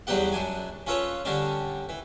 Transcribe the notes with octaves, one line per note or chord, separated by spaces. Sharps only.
E2 G2 F#3 B3 G4 F#5
F#2 D4 G#5
C#4 F4 A4 B4 C#5
D3 G3 C#4 D4
E3